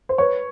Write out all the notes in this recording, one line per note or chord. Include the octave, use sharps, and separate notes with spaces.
C5
B4 C#5